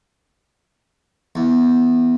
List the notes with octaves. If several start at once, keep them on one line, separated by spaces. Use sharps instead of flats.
E2